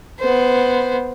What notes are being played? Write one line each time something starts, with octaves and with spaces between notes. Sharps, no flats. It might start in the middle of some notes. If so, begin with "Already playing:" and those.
B3 C5